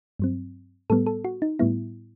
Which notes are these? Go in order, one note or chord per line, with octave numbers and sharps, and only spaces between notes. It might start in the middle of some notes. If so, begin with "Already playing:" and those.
G2 F#3 C4
A2 G3 B3 A4
A4
F#4
D#4
A2 G3 B3 E4